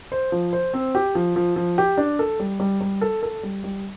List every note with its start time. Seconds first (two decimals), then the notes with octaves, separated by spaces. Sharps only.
0.12 C5
0.32 F3
0.53 C5
0.74 C4
0.95 G4
1.15 F3
1.36 F3
1.56 F3
1.78 G4
1.97 D4
2.19 A4
2.40 G3
2.60 G3
2.81 G3
3.01 A4
3.23 A4
3.43 G3
3.64 G3